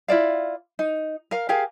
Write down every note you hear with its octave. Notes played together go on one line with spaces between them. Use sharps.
E4 F4 D5 F5
D#4
A#4 F5
G4 G#4 A#4 F5